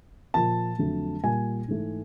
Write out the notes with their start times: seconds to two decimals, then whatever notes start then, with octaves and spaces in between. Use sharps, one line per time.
0.34 A#2 F3 A#3 A5
0.78 F2 D3 F#3 A3
1.24 A#2 G3 A#3 G#5
1.68 G#2 E3 A3